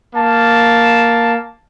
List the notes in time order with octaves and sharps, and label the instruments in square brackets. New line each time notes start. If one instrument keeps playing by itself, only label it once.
[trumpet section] A#3 A5